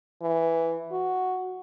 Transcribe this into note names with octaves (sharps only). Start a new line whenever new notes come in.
E3
F#4